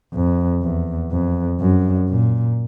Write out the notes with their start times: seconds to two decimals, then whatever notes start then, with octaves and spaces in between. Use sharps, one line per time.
0.14 F2
0.62 E2
1.11 F2
1.60 F#2
2.09 A#2